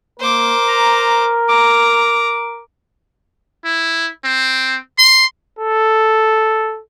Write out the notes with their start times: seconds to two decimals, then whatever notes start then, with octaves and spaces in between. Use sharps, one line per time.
0.20 A#3 A#4 C5 D6
0.68 A#5
1.49 A#5 D6
3.65 E4
4.25 C4
4.98 C6
5.59 A4